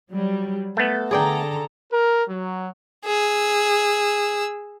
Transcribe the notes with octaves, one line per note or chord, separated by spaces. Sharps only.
F#3 G3
A3 B3 A4
D3 G#4 A4 D5 G5 A#5
A#4
F#3
G#4 E6